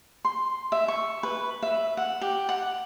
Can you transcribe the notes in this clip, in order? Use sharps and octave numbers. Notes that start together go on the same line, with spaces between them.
C6
E5
C#6
B4
E5
F#5
G4
F#5